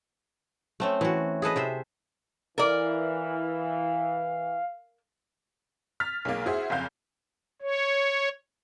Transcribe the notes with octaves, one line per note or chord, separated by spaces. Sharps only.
A3 C4 C#4
E3 F#4
G#4 A4 B4 D#5
C3 C5 E5
E3 A#4 D5 F5
F6 A6 B6
B1 G#3 A#3
E4 F#4 G#4 C5 E5
F#1 F2 F5 G6
C#5